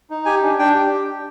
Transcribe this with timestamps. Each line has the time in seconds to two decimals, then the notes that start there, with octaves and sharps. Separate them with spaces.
0.10 D#4
0.25 G4 G#5
0.42 D4
0.59 D4 G5
0.75 G4